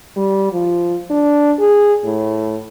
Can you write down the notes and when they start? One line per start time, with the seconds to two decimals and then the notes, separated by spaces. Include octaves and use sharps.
0.16 G3
0.52 F3
1.10 D4
1.59 G#4
2.04 A2